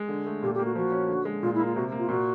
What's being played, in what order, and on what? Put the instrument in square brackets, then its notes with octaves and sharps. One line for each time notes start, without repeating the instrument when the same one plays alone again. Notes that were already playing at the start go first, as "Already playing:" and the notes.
Already playing: [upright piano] G#3
D3
A3
[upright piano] A#2 [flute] G4
[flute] G4
[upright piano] A#3
[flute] F#4
[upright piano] F3 [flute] F#4
[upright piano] C#4
D3
G#3
[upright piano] A#2 [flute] F4
[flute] E4
[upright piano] A#3
[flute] F4
[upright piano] C3 [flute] F#4
[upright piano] A#3
[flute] F4
[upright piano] A#2 [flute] F#4